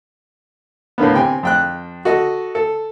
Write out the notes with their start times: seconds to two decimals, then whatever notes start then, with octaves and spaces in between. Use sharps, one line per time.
0.98 A2 D3 A#3 B3
1.14 C3 G5 G#5
1.43 F2 G5 F#6
2.05 F#4 A4 D#5
2.55 A4